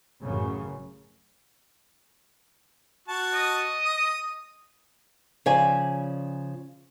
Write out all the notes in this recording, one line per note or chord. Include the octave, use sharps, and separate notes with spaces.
A1 F#2 C#3
F#4 A5
D#5
D#6
C#3 F3 D5 G#5